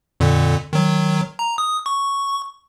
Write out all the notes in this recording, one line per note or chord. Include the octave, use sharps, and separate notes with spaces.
F2 A#2 D3
D#3 F#3
A#5
D#6
C#6